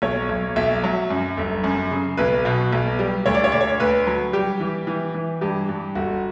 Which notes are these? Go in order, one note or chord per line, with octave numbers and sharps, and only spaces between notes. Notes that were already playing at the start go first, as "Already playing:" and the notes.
B1 C#5
B1
B1 E5
F#3
F#2
G1
F#2
C#3
B1 B4
B2
B1
G3
D2 C#5
D5
C#5
D2 D5
C#5
D2 B4
F#3
G3 G4
E3
E3
E3
G2 G4
G2
G1 F#4